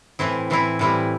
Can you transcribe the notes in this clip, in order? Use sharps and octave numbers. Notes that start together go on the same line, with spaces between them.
A2 E3 C4 E4
A2 E3 C4 E4
A2 E3 G3 C4 E4